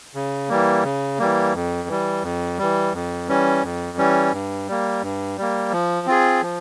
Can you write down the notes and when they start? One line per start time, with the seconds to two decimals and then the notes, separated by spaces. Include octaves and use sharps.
0.15 C#3
0.49 E3 G3 A#3
0.84 C#3
1.19 E3 G3 A#3
1.54 F2
1.88 E3 G3
2.23 F2
2.58 E3 G3
2.93 F2
3.28 E3 G3 C#4
3.63 F2
3.97 E3 G3 C#4
4.33 G2
4.68 G3 A#3
5.02 G2
5.38 G3 A#3
5.72 F3
6.07 C4 F4 G#4
6.42 F3